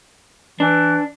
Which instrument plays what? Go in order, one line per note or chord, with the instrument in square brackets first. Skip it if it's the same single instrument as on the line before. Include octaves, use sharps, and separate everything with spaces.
[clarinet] E3 [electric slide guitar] D4